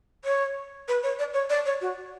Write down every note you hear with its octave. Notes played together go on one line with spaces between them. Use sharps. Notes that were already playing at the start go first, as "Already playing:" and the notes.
C#5
B4
C#5
D5
C#5
D5
C#5
F#4